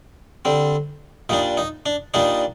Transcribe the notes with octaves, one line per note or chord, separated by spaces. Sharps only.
D3 G3 C4
A#2 G3 D4 D#4
D#4
D4
A#2 G3 D4 D#4